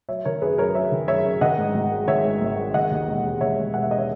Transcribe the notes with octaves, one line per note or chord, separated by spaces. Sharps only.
F#3 C#5 E5
D#3 A#4 C#5
F#2 G#4 B4
F#2 A#4 C#5
F#3 C#5 E5
D#3
F#2 C#5 E5
F#2
D#3 D#5 F#5
G#2
G#1
G#3
D#3 C#5 E5
G#2
G#1
G#3
D#3 D#5 F#5
D#2
E1
G#3
D#3 C#5 E5
D#2
E1 F#5
E5
G#3 D#5
C#5 E5